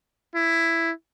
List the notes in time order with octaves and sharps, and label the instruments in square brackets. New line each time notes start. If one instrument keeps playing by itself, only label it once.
[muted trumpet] E4